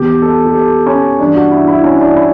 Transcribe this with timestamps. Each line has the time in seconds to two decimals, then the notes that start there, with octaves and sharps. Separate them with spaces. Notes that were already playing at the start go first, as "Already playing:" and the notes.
Already playing: E2 B2 G4
0.22 A4
0.45 G4
0.54 A4
0.87 C#4
1.19 G2 E3 D4
1.35 F#4
1.52 E4
1.68 E4
1.84 C#4
1.95 E4
2.01 D4
2.16 E4